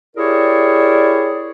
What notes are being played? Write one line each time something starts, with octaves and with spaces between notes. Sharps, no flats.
E4 G4 G#4 A#4 C#5 D5